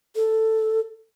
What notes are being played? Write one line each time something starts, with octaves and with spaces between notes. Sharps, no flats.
A4